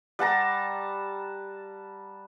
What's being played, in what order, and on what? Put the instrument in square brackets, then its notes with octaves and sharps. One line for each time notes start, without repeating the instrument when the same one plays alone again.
[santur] G3 F#5 A5 A#5